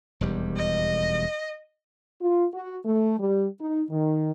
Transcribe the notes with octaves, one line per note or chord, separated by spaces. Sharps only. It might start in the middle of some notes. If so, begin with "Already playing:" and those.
E1 D#2 G3
D#5
F4
F#4
A3
G3
D#4
D#3